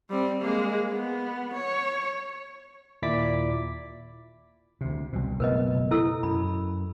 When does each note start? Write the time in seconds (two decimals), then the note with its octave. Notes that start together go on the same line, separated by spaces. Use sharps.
0.10 G3 C4
0.41 G#3 A#3
0.92 B3
1.54 C#5
3.02 D#2 A#2 E4 D5 D6 B6
4.81 D2 C3
5.13 C2 B2
5.40 F#1 B2 A3 A#4 B4 D#5
5.91 E4 A4 E6
6.23 F#2 B5